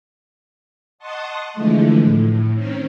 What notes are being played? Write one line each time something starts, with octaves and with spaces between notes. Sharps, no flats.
D#5 F#5 A5 C6 C#6 D#6
D3 E3 F3 G#3 A3
A2
D#3 C4 C#4